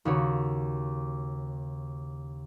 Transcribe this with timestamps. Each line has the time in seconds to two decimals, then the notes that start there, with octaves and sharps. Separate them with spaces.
0.05 D#2 C#3 F#4 C#5